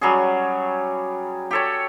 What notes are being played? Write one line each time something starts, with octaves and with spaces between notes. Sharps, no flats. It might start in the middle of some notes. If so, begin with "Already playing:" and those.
F#3 G3 C#4 G#4
G4 A4 C#5